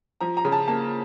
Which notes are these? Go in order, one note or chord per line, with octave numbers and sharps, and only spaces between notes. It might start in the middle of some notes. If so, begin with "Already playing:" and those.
F3 A#5
A#5
C#3
A5
A#3 A5